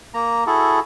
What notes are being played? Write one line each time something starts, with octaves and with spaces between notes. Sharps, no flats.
A#3 A#5
E4 F#4 G#4 A4